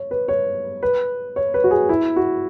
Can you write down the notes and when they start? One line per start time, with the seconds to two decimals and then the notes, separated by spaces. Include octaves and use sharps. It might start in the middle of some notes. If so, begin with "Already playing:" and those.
Already playing: C#5
0.11 B4
0.28 C#5
0.83 B4
1.36 C#5
1.54 B4
1.64 F#4
1.71 G#4
1.89 E4
2.16 F#4